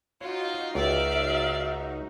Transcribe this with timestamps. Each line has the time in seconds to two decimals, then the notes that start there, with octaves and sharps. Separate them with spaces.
0.21 D#4 F4 F#4 C#5
0.75 C#2 D5 E5 F5